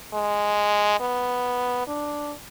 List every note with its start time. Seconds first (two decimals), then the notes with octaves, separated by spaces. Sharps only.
0.13 G#3
1.00 B3
1.87 D4